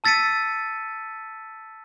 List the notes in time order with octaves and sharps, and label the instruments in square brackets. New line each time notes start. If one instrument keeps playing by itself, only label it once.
[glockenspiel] A5 E6 A6 B6 C#7 D#7